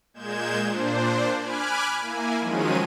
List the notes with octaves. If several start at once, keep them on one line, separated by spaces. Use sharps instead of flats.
A#2 G#3 G6 G#6 E7
A#2 D4 C5
G#5 B5 D6 F6 F#6 G#6
A#3 E4 G#5
D#3 F3 F#3 G#3 C#4 D#7